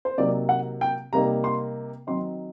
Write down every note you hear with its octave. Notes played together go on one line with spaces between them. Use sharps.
C5
C3 F#3 A#3 D#4 D5
F#5
G5
C3 G3 A#3 D#4 A#5
C6
D#3 F#3 C4 D#4 C6